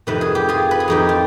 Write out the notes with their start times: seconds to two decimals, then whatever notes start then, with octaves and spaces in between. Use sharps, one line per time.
0.07 F2 C3 D#3 B4
0.21 G#4
0.35 G4
0.49 F4 G#4
0.71 B4
0.80 G#4
0.88 F2 D#3 D#4 G4
1.09 F4